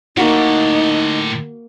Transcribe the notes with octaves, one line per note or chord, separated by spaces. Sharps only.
A2 D3 A#3 D#4 F#4